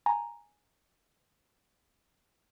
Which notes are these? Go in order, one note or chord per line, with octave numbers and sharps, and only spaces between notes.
G#5 A#5